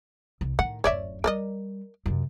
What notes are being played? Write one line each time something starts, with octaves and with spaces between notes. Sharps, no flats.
C2
A2 D#3 F#5
D1 F#2 C#5 D5 E5
G3 A#4 D5 D#5
F#2 C3